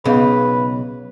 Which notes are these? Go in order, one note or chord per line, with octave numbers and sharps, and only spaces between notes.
B1 C#3 B3 B4 F5